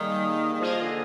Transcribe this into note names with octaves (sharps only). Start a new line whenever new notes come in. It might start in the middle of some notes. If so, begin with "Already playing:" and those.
Already playing: D#3 G3 A#3 D#4 G#4
D#3
F3 A#3 F4 G#4 D#5
D3